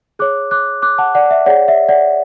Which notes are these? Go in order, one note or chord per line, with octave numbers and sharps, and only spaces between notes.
G#4 C#5 D6 F#6
D6 F#6
D6 F#6
F#5 A5
D5 F#5
E5
G#4 C#5 D5 F#5
E5
D5 F#5